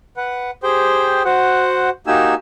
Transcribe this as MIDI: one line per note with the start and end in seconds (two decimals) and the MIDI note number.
0.17 0.51 71
0.17 0.51 78
0.63 1.23 67
0.63 1.23 68
0.63 1.23 72
0.63 1.23 79
1.25 1.90 66
1.25 1.90 72
1.25 1.90 78
2.07 2.34 58
2.07 2.34 63
2.07 2.34 66
2.07 2.34 67
2.07 2.34 80
2.07 2.34 88